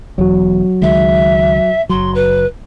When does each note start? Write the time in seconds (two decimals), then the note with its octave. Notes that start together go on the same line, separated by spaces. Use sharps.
0.18 E1 E2 F#3 F#4
0.82 C#2 D#3 G#3 E5
1.89 F#1 F#3 C6
2.14 B4